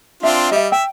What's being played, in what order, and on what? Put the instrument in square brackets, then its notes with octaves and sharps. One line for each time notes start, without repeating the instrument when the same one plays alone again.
[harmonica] C4 D4 F4 [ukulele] E5
[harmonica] G3 [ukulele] D#5 E5
[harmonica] E5 [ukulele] G5